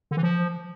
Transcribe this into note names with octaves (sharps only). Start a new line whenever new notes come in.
D3
E3
F3